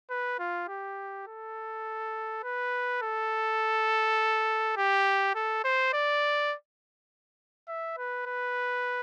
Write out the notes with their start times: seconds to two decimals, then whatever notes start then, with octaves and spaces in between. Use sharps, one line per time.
0.10 B4
0.39 F4
0.68 G4
1.27 A4
2.43 B4
3.02 A4
4.77 G4
5.35 A4
5.64 C5
5.93 D5
7.68 E5
7.97 B4
8.26 B4